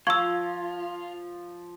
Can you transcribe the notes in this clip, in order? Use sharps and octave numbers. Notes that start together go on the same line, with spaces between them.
F3 F4 C#6 E6 G#6